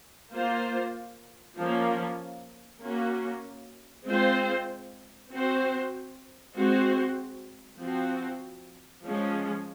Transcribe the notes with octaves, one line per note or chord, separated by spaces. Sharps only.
A#3 F4 C5
F3 A#3 C#4
A#3 C#4 F#4
G#3 C4 F4 C5
C4 F#4 C5
G#3 C4 F#4 C5
F3 C4 F#4
F3 G#3 C#4